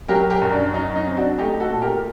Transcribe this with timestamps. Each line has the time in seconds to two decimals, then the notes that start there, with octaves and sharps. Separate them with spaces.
0.08 F#3 G4 A#4
0.30 G4 A#4
0.42 F#2
0.52 D4
0.73 F#3 D#4
0.95 D#4
1.07 C4
1.17 D4 F#4
1.38 A3 D#4 G4
1.60 F#4 A4
1.71 A#2
1.82 G4 A#4